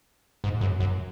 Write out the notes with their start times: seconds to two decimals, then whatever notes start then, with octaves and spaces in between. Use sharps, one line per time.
0.44 G#2
0.61 F#2
0.80 F#2